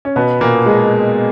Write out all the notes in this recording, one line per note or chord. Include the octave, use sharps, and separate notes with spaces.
C#4
B2 B3
A#2 A#3
G#3